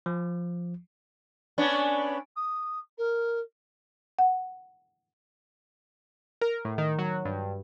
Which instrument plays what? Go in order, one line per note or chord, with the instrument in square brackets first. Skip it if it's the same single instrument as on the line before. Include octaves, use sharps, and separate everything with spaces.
[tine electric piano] F3
[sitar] B3 C#4 D4
[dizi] D#6
A#4
[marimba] F#5
[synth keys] A#4
A2
D#3
F#3
G2